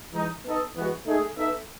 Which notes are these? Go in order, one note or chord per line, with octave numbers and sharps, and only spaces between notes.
E3 G#3 D#4
B3 D#4 A4 D#5
E3 G#3 B3 F#4
A3 D#4 G#4
B3 D#4 A4 E5